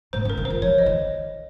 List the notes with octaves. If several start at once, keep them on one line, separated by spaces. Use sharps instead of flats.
G#2 C5
C#3
A#4
D#3
C5
F3
F3 C#5
D#5
D#3